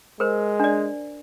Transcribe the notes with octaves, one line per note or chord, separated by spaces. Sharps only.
G#3 A#4 C5
D4 D5